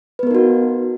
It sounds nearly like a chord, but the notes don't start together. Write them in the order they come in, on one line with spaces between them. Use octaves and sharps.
B4 B3 A#4 D#4 F#4